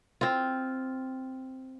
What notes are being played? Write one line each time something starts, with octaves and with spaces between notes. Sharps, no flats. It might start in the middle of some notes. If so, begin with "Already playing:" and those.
C4 F4